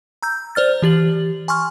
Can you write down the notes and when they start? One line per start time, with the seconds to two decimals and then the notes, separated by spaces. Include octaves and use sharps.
0.23 A#5 E6 G6
0.55 C5 D5 F6 A6
0.82 E3 G4 A6 F#7
1.48 G#5 C6 C#6 F6